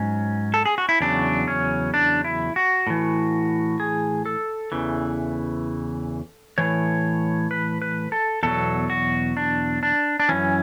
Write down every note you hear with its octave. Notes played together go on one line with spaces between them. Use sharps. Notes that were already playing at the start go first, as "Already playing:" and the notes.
Already playing: G#2 F#3 C#4
A4
G#4
F#4
E4
E2 C#3 F#3 D4
C#4
D4
E4
F#4
A2 E3
G#4
A4
E2 C#3 E3
A2 E3 C#5
B4
B4
A4
E2 B2 F#3 A4
F#4
D4
D4
D4
F#2 E3 C#4